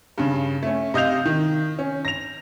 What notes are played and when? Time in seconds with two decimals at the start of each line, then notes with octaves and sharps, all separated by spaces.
0.18 G2 C#3
0.63 A3 C#4
0.94 C3 D#5 F5 G6 F7
1.25 D#3
1.79 C#4
2.05 A#6 F7